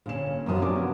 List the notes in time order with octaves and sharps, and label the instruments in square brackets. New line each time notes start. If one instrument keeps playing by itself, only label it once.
[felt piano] G1 E7 [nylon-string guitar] A#2 C#4
[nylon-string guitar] F#2 F3 [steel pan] F#3 A#3 [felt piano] B3 D#6
[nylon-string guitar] C3 D4 [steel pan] C#4 [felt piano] A#4 D6
[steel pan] B3